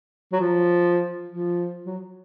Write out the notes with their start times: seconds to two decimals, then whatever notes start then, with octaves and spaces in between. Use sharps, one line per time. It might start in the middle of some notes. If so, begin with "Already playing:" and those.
0.33 F#3
0.41 F3
1.28 F3
1.86 F#3